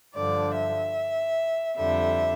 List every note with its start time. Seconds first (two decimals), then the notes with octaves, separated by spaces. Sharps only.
0.16 G2 D3 F3 D5
0.57 E5
1.78 F2 D3 G3 E5